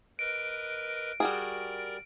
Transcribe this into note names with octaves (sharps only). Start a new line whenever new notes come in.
A#4 B4 D#5 D7
G3 F#4 G#4 A#4 D5